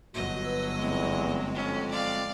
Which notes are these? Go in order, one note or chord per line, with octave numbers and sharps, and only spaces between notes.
G1 F#3 F#4 D#5
B4 E6
E2 G#3 C4
F2 C#4
D5 F5